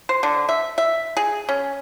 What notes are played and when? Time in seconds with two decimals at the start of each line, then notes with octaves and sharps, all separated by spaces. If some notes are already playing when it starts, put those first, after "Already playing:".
0.09 C5
0.23 D3
0.49 E5
0.78 E5
1.17 G#4
1.49 C#4